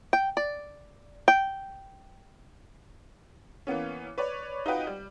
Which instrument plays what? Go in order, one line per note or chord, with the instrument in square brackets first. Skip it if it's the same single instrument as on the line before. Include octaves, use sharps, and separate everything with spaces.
[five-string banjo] G5
D5
G5
[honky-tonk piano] E3 A#3 B3 C#4
B4 C#5 D5
D#4 F4 F#4 B4 D#5 G5
G3